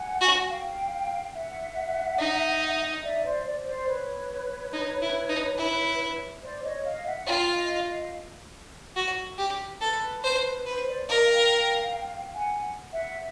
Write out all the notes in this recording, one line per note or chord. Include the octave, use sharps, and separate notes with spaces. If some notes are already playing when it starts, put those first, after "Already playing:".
Already playing: F#5 G#5
F#4
F5 G5
E5 F#5
D#4
D5 E5
C5 D5
C5 D5
C5 D5
B4 C#5
D#4
E4
D#4
E4
C5 D5
C#5 D#5
D#5 F5
E5 F#5
F4 F5 G5
D#5 F5
D#5 F5
F#4
G4
A4 B4
C5
B4 C5
C5 D5
A#4 D#5 F5
F5 G5
F#5 G#5
E5 F#5